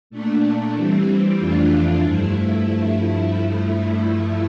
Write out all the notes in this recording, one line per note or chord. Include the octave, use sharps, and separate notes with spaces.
A#2 A3 D4
E3 G3 C4
F2 E3 A3 D4 F4
G2 F3 A3 E4